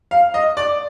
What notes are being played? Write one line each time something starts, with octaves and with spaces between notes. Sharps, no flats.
F5
D#5
D5